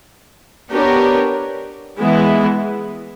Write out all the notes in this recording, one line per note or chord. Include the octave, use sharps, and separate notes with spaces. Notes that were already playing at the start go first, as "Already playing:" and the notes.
B3 D4 G4 A#4 C#5
E3 G#3 B3 E4